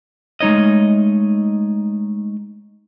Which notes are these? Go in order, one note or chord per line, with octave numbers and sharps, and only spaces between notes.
G#3 A3 D#4 C#5 D#5